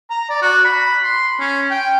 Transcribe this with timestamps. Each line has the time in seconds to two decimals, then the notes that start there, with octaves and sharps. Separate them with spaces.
0.10 A#5
0.30 D5
0.42 F#4
0.65 B5
1.04 C6
1.40 C#4
1.71 G5